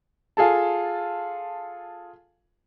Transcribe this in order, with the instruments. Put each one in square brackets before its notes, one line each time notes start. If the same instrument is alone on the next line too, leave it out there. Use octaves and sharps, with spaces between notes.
[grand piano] F4 G#4 A4 A5